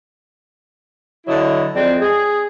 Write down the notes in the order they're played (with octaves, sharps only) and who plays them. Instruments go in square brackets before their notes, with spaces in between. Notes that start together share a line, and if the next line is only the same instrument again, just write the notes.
[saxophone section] D3 F#3 E4 D#5
F2 G#3 C4 D5
G#4